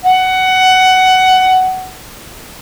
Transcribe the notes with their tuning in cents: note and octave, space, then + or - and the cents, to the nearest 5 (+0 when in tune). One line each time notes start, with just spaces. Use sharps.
F#5 +15